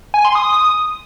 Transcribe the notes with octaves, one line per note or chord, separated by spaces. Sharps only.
G#5
C6
D#6